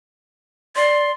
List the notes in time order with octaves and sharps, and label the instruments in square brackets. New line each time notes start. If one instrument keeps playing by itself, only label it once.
[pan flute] D5 [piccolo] C6